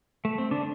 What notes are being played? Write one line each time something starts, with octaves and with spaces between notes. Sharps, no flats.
A3
C4
D3 D4